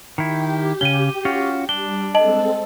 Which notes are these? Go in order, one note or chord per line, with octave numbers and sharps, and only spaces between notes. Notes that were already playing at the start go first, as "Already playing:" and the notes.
D#3 E4 G4
C#3 C#4 D#7 G7
C#4 F4 F#4
G3 D4 G7
G#3 C4 A4 D#5 A5 F#7